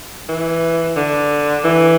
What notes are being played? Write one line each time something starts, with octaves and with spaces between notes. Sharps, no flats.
E3
D3
E3